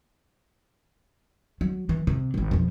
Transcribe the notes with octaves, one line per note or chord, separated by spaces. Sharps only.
F#3
E3
C3
D#1 G#1
F2 B2